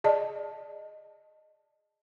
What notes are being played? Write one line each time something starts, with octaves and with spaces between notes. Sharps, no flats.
G#4 D5 D#5 A5